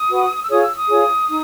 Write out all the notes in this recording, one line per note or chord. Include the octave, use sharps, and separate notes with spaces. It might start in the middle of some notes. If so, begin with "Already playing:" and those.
Already playing: D#6
F#4 B4
E6
F4 G#4 C#5 D#6
E6
D#6
F4 G#4 C#5
D#4